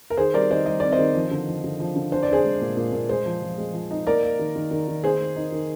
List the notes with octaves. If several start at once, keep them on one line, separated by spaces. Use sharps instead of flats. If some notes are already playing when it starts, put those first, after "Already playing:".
A#4
D#3 G#4 C5
G3 A#4 D5
D#3 C5 D#5
G3 D#5
C4 D5
C5 D#5
D#3
F3
D3
F3
D3
F3
D3
D4 C5
D5
D4 G#4 C5
G#3
A#2
A#2
A#2
G#3 G#4 C5
F3
F3
G#3
F3
D#4
A#3 A#4 D5
A#3
D#3
D#3
D#3
D#3
A#3 G#4 C5
A#3
D#4
D#3